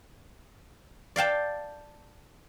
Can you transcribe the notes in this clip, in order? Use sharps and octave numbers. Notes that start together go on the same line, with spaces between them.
D5 F5 G5 A5